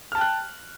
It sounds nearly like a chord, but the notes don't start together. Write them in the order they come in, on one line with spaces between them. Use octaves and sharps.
F6 A5 G5 F#6